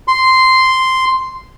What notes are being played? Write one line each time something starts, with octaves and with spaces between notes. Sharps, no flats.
C6